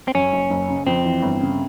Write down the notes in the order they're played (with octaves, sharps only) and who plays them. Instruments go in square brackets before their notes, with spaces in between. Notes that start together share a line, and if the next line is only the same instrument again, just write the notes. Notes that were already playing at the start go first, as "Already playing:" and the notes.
[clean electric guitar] C4
[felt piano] F#2 [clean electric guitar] C#4
[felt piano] F#1
F#1
C#3
[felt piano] F2 [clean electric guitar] C4
[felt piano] E3
G1
C#3